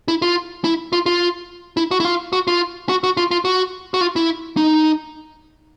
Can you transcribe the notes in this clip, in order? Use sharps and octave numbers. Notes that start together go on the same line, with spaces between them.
E4
F4
E4
F4
F4
E4
F#4
E4
F4
F#4
F4
F#4
F#4
F4
F4
F#4
F#4
F4
E4
D#4